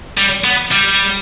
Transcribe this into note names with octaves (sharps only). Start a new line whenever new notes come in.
G3
B3
G3